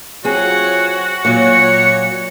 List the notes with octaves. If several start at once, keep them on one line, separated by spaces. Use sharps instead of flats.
F#3 C4 F4 F#4 G#4 C#5
A#2 F#3 C#5 C#7